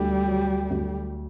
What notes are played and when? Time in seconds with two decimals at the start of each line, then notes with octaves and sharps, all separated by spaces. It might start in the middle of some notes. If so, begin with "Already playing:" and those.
Already playing: D2 G3
0.26 F#3
0.70 D2